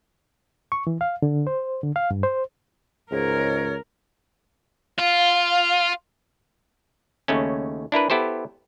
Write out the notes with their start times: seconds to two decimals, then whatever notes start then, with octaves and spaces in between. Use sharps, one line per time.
0.72 C#6
0.87 E3
1.01 F5
1.22 D3
1.47 C5
1.83 D3
1.96 F5
2.11 G2
2.23 C5
3.12 C#2 G#2 A#4 C#5
4.99 F4 F5
7.28 D#2 C#3 A3 C#4
7.92 D4 E4 A#4 B4
8.10 B3 E4 G4 A4 C5